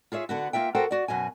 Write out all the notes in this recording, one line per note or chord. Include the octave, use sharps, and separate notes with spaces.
F4 G#4 C#5 E5
D3 B3 F#4
A#3 F4 E5 G5
F#4 A4 A#4 C5 F#5 G5
F#4 D5
F#2 B2 F#4 G#5